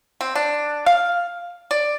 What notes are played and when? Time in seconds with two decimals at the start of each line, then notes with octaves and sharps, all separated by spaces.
0.21 C4
0.35 D4
0.86 F5
1.71 D5